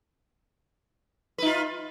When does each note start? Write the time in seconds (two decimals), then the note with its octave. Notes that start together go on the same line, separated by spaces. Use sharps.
1.38 B4
1.42 D#4
1.46 F4